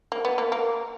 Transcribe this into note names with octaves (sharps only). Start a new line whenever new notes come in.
A#3
B3
A#3
A#3